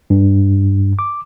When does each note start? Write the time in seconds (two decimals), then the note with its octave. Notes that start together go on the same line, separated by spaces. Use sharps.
0.10 G2
0.99 D6